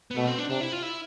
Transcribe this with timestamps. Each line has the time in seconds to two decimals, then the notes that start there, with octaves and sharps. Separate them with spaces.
0.11 B3
0.16 B2 A3
0.27 C4
0.38 D4
0.49 C3 D4
0.61 E4
0.72 F4
0.83 E4